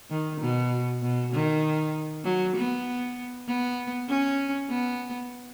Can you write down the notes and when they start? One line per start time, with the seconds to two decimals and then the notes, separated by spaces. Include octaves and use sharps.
0.10 D#3
0.40 B2
1.02 B2
1.32 D#3
2.24 F#3
2.56 B3
3.47 B3
4.09 C#4
4.69 B3